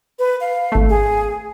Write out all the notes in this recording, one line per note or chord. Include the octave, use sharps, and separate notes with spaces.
B4
F5
G#1 A3
G#4